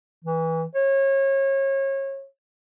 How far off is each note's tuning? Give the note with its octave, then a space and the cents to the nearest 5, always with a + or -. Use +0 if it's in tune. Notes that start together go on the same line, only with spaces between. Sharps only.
E3 -20
C#5 -30